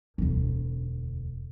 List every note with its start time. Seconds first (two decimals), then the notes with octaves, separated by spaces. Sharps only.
0.18 E1 D2